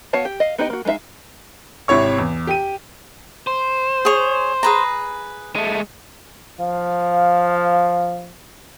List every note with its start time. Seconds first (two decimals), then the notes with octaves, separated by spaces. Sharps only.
0.13 B3 F#4 C#5 F5 A5
0.25 G4
0.40 D#5 F5
0.58 B3 D#4 G4 D#5
0.70 A#3 F#4
0.85 G#3 B3 D#4 E5 F5
1.88 G#1 C3 E4 C#5 C#6
2.19 E2
2.47 G4 D#7
3.47 C5
4.05 G#4 C#5
4.63 G#4 B4 A#5
5.55 G#3 A3
6.61 F3 F5